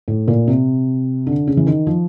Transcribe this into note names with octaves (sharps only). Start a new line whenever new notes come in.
A2
A#2
C3
D3
C#3
E3
D#3
F3